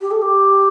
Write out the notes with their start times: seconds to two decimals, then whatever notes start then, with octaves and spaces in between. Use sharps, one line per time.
0.01 G4
0.11 A4
0.22 G4